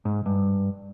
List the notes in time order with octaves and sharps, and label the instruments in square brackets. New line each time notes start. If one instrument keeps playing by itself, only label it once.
[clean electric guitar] G#2
G2